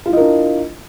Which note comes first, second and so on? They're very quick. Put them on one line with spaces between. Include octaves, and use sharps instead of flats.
F4 E4 D#5 A#4 D4